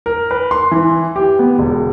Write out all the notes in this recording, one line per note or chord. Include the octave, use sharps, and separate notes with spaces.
A#4
B4
C6
E3
G4
B3
E1